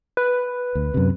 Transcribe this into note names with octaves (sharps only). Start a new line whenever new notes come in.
B4
D2
F#2 C3